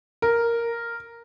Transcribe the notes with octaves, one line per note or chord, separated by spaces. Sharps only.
A#4